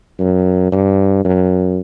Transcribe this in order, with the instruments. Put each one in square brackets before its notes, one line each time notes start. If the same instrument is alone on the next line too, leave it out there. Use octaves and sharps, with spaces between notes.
[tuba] F#2
G2
F#2